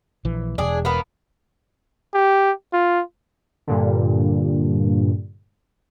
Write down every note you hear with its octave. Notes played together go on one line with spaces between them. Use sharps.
A#1 E3
E1 D4 G#4
A#3 B3
G4
F4
G2 A#2 D3